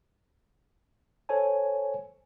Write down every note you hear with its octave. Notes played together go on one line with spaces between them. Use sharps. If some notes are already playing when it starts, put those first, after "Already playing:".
A4 C5 C#5 G#5 A5